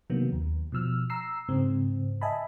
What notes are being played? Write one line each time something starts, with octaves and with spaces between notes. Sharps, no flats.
C3 D#3 F#3 A#3 B3
D#2
B2 F3 E6 F6
A#5 E6 C7
G#2 C#3 C4
D#5 E5 G#5 A5 B5